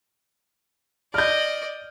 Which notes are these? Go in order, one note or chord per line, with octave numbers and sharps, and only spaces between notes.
D5 D#5 F6 G6